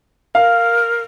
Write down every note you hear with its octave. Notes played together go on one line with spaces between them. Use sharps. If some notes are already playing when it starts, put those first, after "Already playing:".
A#4 F5